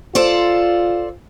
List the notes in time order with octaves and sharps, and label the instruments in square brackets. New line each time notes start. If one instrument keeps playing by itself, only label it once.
[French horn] F4 [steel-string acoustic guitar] A4 C5 D5